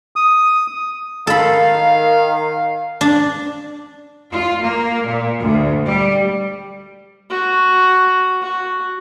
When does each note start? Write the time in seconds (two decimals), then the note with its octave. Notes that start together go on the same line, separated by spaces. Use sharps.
0.16 D#6
1.27 D#3 A4 F5 B5
3.01 D4
4.32 F4
4.63 A#3
5.06 A#2
5.42 D2
5.85 G3
7.30 F#4
8.42 F#4